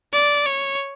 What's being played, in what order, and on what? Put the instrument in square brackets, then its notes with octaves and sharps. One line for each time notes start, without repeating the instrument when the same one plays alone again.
[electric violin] D5
C#5